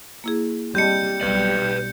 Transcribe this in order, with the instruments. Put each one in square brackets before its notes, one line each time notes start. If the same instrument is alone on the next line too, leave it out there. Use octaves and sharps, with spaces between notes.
[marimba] A#3 E4 G#4
[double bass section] G3 [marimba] C4 D#5 A5 [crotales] G6 C#7
[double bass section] B1 G3 [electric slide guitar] B4 D5